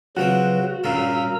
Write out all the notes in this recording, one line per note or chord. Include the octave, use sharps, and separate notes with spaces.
C#3 F3 F#3 C4 F#4 B4
G2 A#2 C#3 A#4 A#5 E6